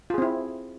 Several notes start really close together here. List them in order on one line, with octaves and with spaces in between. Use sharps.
F4 G#4 C4 E4